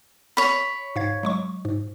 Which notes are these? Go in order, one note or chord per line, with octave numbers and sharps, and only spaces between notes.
C#5 B5
G#2 F5 G#6
F#3 G#3 C#6
G#2